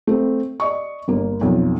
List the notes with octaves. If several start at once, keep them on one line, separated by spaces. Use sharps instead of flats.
A3 C4
D5 D#5 C#6
G1 A#3
B1 F2